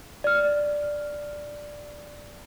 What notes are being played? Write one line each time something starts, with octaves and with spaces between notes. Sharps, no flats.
D5 F6